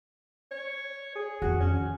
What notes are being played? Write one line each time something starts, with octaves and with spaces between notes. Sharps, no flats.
C#5
G#4
F2 D#3 F#4
C#4